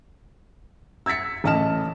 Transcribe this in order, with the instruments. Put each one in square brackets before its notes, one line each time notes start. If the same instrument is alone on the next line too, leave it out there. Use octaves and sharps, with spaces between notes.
[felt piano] E6 G#6 A6 B6 C#7
A1 A3 D#5 A5 F6 E7